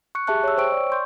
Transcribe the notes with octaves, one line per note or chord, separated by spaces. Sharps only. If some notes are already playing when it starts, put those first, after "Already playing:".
C#6 F#6 C#7
G4 G#4 E5 A5 C#6 F#6
C#5 E6
C5 C#5 G5 C#6 E6 D7
D5
C6 C#6 G6